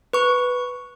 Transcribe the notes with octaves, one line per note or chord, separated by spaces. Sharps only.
B4 C#6